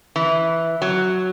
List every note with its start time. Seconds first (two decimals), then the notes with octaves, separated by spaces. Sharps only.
0.16 E3
0.82 F#3